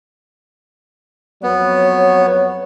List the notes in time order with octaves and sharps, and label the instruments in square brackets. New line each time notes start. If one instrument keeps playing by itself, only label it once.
[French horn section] F2 F#3 C#5 [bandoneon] B3